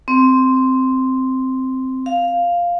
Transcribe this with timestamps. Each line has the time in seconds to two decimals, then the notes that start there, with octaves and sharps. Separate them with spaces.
0.08 C4
2.06 F5